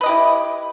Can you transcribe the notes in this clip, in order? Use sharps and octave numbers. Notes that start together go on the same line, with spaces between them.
E4 G4 B4 D#5